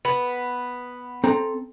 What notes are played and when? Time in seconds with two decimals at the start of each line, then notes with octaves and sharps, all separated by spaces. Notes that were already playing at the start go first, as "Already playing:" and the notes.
0.05 B3
1.24 C4 A4 A#5